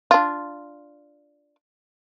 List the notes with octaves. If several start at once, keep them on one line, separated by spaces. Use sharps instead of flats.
D4 F4